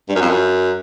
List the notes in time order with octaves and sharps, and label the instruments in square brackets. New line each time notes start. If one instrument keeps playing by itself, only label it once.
[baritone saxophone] G2
F#2
F2
F#2